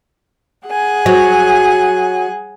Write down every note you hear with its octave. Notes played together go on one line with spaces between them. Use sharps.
G#4 F#5 G#5
F#3